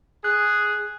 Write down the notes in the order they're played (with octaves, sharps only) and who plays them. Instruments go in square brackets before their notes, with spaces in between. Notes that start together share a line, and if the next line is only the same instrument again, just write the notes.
[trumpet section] G#4 [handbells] F#6